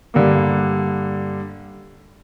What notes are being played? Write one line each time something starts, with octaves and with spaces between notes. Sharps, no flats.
G2 D3 G3 A#3